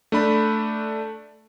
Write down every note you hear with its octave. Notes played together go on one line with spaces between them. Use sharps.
A3 D4 B5